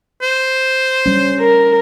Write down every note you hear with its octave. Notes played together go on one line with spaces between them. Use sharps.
C5
G3 C#4
A#4